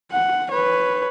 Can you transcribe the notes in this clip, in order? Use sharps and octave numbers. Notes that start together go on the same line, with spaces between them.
F#5
B4 C#5